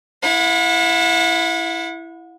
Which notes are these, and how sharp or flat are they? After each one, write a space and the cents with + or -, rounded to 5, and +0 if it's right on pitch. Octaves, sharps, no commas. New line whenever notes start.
E4 +10 F#5 -40